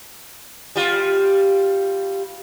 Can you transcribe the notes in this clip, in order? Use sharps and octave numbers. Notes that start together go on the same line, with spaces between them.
G3 F4